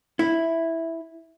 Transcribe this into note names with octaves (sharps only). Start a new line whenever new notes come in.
E4